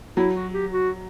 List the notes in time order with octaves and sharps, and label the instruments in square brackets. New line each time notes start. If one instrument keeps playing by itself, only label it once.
[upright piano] F#3 [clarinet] E4
[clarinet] F#4
G4
F#4